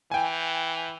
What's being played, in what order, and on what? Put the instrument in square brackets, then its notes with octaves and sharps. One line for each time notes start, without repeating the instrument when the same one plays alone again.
[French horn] E3 [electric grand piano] G5 G#5